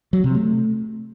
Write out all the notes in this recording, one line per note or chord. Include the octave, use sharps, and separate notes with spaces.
F#3
C3
A3